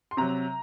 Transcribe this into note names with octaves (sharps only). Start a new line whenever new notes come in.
C6
C3 F#3 A#5